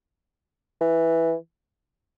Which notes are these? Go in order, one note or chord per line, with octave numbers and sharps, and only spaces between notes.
E3